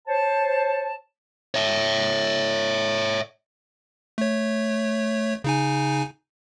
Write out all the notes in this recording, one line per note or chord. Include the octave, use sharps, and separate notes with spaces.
C5 C#5 A5
C#5 E5
A3 C#5
C#3 D#4 G#5